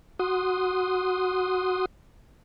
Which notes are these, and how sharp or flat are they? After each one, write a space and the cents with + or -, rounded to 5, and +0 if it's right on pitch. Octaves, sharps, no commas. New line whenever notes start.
F#4 +0 C6 +0 D#6 -5